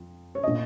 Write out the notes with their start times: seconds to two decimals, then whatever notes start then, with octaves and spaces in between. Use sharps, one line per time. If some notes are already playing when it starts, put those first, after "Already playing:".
Already playing: F2
0.35 C#5
0.43 A#2 D#5